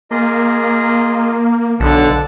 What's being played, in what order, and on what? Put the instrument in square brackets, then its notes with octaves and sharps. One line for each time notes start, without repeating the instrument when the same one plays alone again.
[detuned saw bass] A#3 [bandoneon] F4 G#4 D#5
[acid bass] B1 [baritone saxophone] D3 [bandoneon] F3 F#5 A5